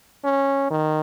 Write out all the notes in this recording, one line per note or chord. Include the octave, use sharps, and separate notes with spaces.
C#4
D#3